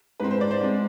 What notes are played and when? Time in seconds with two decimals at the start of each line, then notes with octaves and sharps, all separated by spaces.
0.20 G#2 G#3 C4 B4
0.30 C5
0.41 D5
0.51 C5
0.61 G#2 G#3 C4